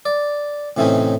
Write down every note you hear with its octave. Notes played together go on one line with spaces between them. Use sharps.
D5
A2 C3 E3 C4 C#4 D#4